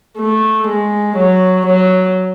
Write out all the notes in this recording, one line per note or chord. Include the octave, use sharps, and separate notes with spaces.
A3
G#3
F#3
F#3